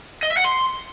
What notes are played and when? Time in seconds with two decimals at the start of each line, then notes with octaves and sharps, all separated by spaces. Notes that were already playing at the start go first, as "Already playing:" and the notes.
0.23 D#5
0.30 E5
0.37 F#5
0.44 C6